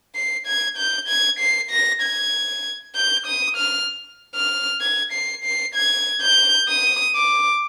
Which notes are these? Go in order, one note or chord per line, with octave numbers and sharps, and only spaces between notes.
C7
G#6
G6
G#6
C7
A#6
G#6
G6
D#6
F6
F6
G#6
C7
C7
G#6
G6
D#6
D6